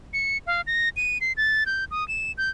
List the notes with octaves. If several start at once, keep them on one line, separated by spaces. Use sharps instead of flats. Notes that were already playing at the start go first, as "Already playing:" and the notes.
C#7
F5
A#6
D#7
C7
A6
G6
D#6
E7
G6